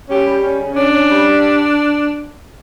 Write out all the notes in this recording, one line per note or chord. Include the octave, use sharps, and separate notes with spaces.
C#4 G4
G3
C#4
C#3
C#4 D4
C#4
G3
G3